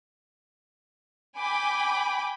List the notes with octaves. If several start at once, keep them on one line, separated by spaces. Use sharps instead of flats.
G5 G#5 B5 D6